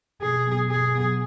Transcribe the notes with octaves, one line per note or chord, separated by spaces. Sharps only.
B2 G#4
F#3 B3
B2 G#4
F#3 B3